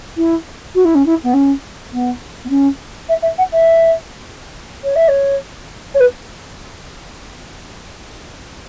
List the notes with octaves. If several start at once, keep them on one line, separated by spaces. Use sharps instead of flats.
E4
F#4
E4
C#4
E4
B3
C#4
B3
B3
C#4
E5
E5
F#5
E5
C#5
E5
C#5
C#5
B4